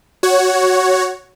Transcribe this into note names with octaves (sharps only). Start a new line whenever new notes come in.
F#4 C#5